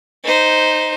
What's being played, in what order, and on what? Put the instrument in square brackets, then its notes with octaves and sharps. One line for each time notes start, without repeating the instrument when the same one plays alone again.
[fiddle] D#4 C5